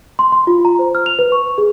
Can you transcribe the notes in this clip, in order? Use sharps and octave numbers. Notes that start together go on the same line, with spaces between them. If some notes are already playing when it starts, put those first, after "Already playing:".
C6
C6
F4
A#5
C5
F6
F7
B4
C#6
G#4